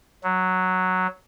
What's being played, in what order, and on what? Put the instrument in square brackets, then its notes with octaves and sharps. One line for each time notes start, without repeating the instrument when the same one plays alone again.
[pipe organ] F#3